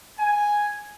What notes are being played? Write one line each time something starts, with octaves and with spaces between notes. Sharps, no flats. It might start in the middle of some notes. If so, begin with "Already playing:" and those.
G#5